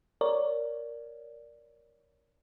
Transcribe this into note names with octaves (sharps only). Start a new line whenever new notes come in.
A#4 C#5 D5